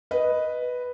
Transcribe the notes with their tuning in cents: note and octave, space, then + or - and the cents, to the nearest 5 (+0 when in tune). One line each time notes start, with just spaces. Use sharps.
B4 +0 D#5 +0